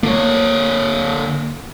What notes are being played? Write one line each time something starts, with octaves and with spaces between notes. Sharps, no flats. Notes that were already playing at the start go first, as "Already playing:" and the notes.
D3 A#3 C#5